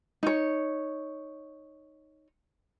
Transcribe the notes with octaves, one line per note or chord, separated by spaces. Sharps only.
D#4 C#5